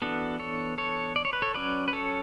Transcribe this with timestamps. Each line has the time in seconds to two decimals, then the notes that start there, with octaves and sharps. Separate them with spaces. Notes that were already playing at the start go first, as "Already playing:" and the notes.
0.02 E3 B3 D4 F#4 A4
0.39 A4 C#5
0.78 A4 C#5
1.16 D5
1.25 C#5
1.33 B4
1.42 A4 C#5
1.54 F#3 C#4 B4 D5
1.88 B4
1.93 A4 C#5